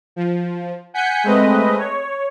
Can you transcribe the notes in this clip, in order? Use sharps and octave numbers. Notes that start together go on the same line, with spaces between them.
F3
F#5 G#5 G6 B6 C#7
G#3 A3 C4 B4 D#5
C#5